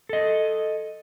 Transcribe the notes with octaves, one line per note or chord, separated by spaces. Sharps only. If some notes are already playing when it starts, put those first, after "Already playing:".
A4 D#5